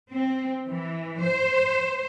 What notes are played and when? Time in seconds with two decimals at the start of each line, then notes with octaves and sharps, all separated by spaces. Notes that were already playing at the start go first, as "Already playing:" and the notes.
0.12 C4
0.67 E3
1.23 C5